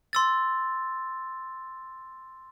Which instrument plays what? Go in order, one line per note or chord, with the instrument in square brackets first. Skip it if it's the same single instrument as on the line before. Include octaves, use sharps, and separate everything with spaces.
[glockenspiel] C6 E6 A6